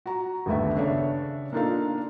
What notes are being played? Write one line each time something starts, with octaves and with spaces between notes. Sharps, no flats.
F#4 A#5
G1 D#2 A3 B3 E5
C#3 D4 A4 C#5 E5
A#3 D4 D#4 F4 A4 F5